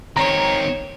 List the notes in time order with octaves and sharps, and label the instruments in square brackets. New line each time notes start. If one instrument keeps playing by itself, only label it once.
[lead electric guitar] D#3 C4 [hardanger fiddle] C#5 [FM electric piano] A#5